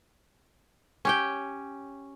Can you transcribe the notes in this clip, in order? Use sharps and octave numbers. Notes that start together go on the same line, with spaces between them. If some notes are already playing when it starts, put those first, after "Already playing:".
C#4 G4 G5